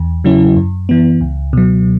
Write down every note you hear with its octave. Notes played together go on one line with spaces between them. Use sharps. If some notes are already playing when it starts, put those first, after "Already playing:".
Already playing: E2
C#3 F#3 C#4 E4
F#2
E3 B3
C#2
B2 F#3